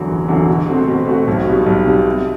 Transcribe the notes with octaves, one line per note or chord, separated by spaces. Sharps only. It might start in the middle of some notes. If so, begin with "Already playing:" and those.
Already playing: E2 D3 F#3
F#1
E2 D3 F#3
B2
A3 C4 F#4
B2
A3 C4 F#4
B1
B2 G3 B3
B1
B2 G3 B3
C3